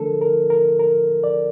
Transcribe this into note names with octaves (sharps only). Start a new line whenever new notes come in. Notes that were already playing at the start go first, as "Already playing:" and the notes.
Already playing: D3 F3 A3 D4 A4 A#4
A#4
A#4
A#4
D5